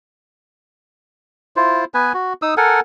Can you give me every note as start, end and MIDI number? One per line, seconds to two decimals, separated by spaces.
1.56 1.85 64
1.56 1.85 65
1.56 1.85 72
1.94 2.13 59
1.94 2.13 71
1.94 2.13 80
2.14 2.33 66
2.42 2.54 63
2.42 2.54 87
2.42 2.54 88
2.57 2.80 69
2.57 2.80 70
2.57 2.80 78
2.57 2.80 80